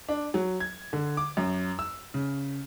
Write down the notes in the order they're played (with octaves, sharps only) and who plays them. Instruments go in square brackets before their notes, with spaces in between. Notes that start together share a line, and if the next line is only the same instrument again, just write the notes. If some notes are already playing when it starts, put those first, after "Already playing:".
[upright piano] D4
F#3
G#6
D3
D6
F#2
E6
C#3